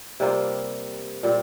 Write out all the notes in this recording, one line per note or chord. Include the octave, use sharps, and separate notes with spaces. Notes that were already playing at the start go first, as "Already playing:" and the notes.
C3 G3 A#3 F4
A#2 G3 C4